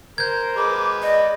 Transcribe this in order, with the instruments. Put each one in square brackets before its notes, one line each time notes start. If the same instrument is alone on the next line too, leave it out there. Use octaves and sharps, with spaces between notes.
[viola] A#4 C5 [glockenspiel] G6 G#6
[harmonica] G#3 B4 [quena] D6
[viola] D5 [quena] D#5